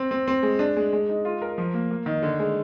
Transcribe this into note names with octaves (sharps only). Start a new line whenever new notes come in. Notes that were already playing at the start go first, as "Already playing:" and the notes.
Already playing: C4
C4
C4
G#3
D4
G#3
G#3
D#4
F4
A#4
F3
A#3
A#3
D#3
D3
G#3